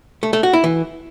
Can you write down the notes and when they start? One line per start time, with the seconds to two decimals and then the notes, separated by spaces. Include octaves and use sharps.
0.23 A3
0.33 A3
0.43 F#4
0.53 E4
0.64 E3